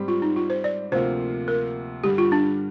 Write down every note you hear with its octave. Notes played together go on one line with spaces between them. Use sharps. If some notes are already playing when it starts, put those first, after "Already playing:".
Already playing: G#2 G3 C4 G4
F4
D#4
F4
C5
D5
D2 C3 F3 A#3 F4 C5
A#4
G2 D3 G3 G4
F4
D4